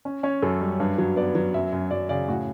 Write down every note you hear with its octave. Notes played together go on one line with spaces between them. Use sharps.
C#4
C#4 C#5
F#2 A4
G3
G2
F#3
B3 D5
F#3
F#2 E5
F#2
F#2 D5
C#3 D5
A2 F#4